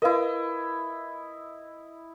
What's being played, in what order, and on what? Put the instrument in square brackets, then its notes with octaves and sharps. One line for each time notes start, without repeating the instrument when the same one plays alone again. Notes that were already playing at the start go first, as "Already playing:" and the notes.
[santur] E4 D#5 [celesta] A#4 B4 F5